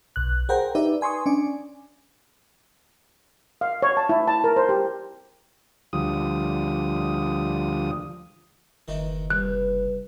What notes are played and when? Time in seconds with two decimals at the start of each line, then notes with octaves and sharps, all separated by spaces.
0.16 B1 F#6
0.49 G#4 A#4 C5 F#5 G5 A#5
0.75 D#4 G4 B4 D5 E5
1.01 B4 G#5 C6 C#6 D#6
1.26 C#4 D4 D5 G#5
3.61 F5
3.82 C#5
3.97 A5
4.09 E4
4.28 A5
4.44 A#4
4.56 C5
4.69 G4
5.93 D2 F3 G3 D#6
8.88 F#1 D#3 E3 D#4
9.30 C2 B4 F#6